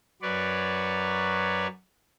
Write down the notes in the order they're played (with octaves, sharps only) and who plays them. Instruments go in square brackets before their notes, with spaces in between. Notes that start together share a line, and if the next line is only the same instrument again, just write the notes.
[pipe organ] F#2 F#3 B4 C#5 D5